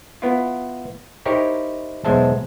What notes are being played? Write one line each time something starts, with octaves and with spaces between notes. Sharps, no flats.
B3 E4 F4
D#4 E4 G4 A#4 C5 C#5
B1 E2 G#3 C5 E5 A5